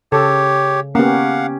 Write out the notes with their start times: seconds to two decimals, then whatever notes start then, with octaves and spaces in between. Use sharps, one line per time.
0.12 C#3 G4 A4 C#5
0.95 A#3 B3 C#4 G4 F5 F#5